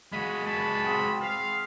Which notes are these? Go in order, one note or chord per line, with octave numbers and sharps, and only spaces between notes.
G#3 F#4 F5 B5
B4 D5 A5 B5
C4 G#4 G5
C5 F5